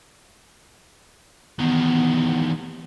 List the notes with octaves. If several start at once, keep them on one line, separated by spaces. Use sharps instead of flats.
E2 D#3 B3